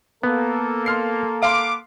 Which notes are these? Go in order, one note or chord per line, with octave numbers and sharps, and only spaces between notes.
A#3 B3 A4
C6 F6 C7
B3 F5 C6 D6